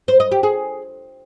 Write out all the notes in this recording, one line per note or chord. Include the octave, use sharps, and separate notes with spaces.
C5
D#5
G4
G#4